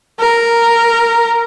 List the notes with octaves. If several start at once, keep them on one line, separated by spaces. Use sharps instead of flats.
A#4